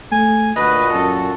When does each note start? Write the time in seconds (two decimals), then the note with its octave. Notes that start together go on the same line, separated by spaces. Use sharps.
0.12 A3 G#5
0.56 D2 A#2 F#4 B4 D#5
0.93 F#2 A4